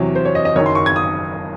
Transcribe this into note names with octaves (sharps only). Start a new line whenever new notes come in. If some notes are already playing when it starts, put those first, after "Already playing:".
Already playing: E2 C3 F#3 C#5
C5
C#5
D#5
D#5
F#1 F#2 D#3 C#5
C6
C#6
G#6
D#6